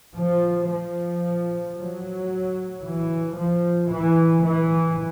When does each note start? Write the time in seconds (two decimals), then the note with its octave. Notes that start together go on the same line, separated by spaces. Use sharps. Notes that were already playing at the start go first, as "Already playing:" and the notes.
0.14 F3
0.68 F3
1.75 F#3
2.82 E3
3.35 F3
3.90 E3
4.43 E3